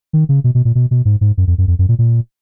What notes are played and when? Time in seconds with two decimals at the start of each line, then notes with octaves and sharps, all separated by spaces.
0.13 D#3
0.29 C#3
0.44 B2
0.55 B2
0.65 A#2
0.75 B2
0.91 B2
1.05 G#2
1.21 G#2
1.37 F#2
1.47 F2
1.58 F#2
1.68 F2
1.79 F#2
1.89 A#2
1.99 A#2